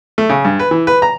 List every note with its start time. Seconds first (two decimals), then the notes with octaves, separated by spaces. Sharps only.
0.18 A3
0.30 C#3
0.45 G2
0.59 B4
0.71 E3
0.87 B4
1.02 A#5